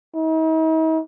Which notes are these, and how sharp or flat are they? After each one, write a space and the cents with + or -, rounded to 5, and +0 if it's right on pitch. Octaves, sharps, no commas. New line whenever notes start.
D#4 +45